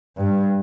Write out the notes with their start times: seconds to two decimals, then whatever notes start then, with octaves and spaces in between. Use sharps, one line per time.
0.17 G2